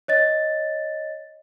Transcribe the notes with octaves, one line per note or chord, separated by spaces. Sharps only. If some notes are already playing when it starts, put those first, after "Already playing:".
C#5 D#5 A6